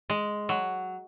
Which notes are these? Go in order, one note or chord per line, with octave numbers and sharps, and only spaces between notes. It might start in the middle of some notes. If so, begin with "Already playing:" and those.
G#3
F#3